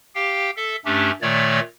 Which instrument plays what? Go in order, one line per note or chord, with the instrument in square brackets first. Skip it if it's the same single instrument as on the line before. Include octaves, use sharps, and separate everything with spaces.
[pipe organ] G4 F5 G5
A4 E5
G2 A3 C#4 D4 G4
A#2 D#3 A3 C#5 D5